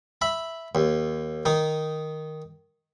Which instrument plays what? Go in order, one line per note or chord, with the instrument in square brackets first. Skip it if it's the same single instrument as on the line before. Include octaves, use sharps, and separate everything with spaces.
[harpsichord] E5 B5
D#2
D#3 D#4